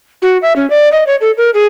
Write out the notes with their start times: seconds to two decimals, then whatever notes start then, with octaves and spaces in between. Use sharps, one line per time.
0.22 F#4
0.42 E5
0.56 C#4
0.70 D5
0.92 D#5
1.07 C#5
1.21 A4
1.37 A#4
1.54 G#4